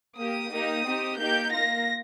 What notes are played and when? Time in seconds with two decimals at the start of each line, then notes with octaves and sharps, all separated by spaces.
0.18 A#3 G4 D#6
0.52 A#3 D#4 G4
0.86 C4 D#4 G4
1.19 A#3 D#4 G4 G6
1.53 A#3 F4 A#6